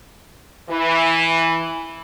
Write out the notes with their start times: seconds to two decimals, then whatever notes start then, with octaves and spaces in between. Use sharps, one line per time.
0.70 E3